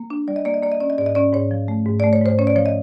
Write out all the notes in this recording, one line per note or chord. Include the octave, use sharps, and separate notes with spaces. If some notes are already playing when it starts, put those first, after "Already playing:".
Already playing: A#3
D4
G3 D5
D#5
A#3 D5
D#5
A#3 D5
D#5
C#4 D5
D#5
G#2 D5
D#5
C#4 D5
G#2 C#5
F3
A3
G#2
D5
A3
C#5
G#2 C5
C#4 C#5
D5
F3 C#5
D#5